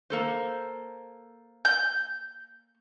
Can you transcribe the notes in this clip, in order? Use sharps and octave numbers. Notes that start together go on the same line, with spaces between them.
A#3 A4 C5
G6